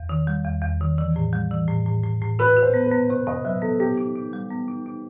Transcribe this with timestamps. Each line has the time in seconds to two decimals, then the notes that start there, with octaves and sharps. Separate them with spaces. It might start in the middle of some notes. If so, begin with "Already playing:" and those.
Already playing: E2
0.09 D#3
0.27 G3
0.45 E2
0.62 E2
0.81 D#3
0.98 E3
1.16 A2
1.33 G3
1.51 E3
1.68 A2
1.86 A2
2.03 A2
2.21 A2
2.39 F#4 B4
2.57 F#4
2.63 C5
2.74 B3
2.86 B4
2.91 B3
3.09 C3 C5
3.27 C3 D#5
3.45 F#3 E5
3.62 B3 A4
3.80 B3 G4
3.97 D#4
4.16 D#4
4.33 G3
4.51 B3
4.68 D#4
4.86 D#4